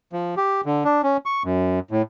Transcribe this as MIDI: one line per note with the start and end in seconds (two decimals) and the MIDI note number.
0.13 0.35 53
0.37 0.61 67
0.65 0.84 50
0.85 1.02 62
1.03 1.17 61
1.26 1.43 85
1.45 1.79 42
1.91 2.02 45